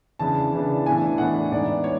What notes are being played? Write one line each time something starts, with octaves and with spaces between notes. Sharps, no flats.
C#3 E3 B3 D4 A5
C#3 E3 B3 D4
A2 E3 B3 D4 G#5
A2 E3 B3 D4 F#5
G#2 E3 B3 D4 D5
C#5